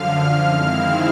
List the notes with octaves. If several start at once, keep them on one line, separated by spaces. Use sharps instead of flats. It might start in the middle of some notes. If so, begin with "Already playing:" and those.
Already playing: F#2 D3 F3 F5 F6
D#3 G#3 C4 E4 F5 F6